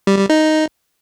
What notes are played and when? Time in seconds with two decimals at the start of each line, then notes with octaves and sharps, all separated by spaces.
0.07 G3
0.18 G3
0.30 D#4